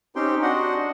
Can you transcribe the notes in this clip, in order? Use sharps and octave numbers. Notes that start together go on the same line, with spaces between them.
C4 C#4 D#4 G4 G5 C6
D4 F#4 D#5 F#5 C6